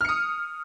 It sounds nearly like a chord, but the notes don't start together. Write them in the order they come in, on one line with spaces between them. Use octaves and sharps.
F6 C#7 D#6